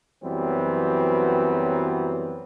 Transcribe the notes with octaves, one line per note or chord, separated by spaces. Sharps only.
F#2 E3 F#3 G3 B3 C4